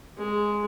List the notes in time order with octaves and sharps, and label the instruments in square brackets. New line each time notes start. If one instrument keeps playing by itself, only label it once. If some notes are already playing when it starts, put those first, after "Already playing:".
[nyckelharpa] G#3